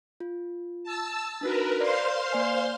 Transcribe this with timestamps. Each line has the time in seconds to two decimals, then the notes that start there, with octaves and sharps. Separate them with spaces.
0.20 F4
0.84 A5 E6
1.41 D4 D#4 F#4 A#4 B4
1.81 C5 D5 F5 C6
2.32 A#3 D5 G#5